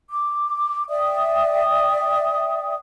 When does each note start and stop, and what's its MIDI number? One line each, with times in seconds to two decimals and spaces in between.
0.10 0.87 86
0.89 2.75 74
0.89 2.75 76
0.89 2.75 79
0.89 2.75 87